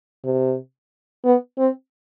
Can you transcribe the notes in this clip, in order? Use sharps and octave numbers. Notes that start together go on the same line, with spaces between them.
C3
B3
C4